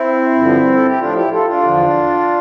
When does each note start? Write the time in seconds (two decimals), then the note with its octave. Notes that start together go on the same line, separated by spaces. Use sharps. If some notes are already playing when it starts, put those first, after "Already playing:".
Already playing: C4 E4
0.35 G2 D3 F3
0.73 A4
0.86 G4
0.99 A2 F3 D4 F4
1.15 E4 G4
1.31 F4 A4
1.47 D4 F4
1.63 E2 D3 F3